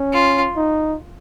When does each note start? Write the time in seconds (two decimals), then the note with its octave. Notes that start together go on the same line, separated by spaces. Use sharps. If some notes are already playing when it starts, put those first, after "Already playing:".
Already playing: C#4
0.13 F4
0.56 D#4